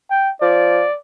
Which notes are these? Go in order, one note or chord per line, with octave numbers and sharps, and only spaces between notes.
G5
F3 D5